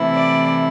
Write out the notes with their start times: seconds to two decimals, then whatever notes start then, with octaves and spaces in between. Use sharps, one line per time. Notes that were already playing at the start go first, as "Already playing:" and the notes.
Already playing: C3 E3 A3 E4
0.14 D5